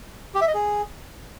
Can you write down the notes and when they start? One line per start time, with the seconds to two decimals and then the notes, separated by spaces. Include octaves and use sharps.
0.35 G4
0.41 E5
0.48 D#5
0.54 G#4